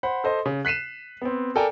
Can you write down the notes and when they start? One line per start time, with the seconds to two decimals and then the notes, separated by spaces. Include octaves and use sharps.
0.03 C5 F#5 B5
0.24 A4 C5 D#5
0.46 C#3
0.65 F#6 B6 C7 D#7 E7
1.22 B3 C4
1.56 A4 A#4 D5 G5 G#5 A#5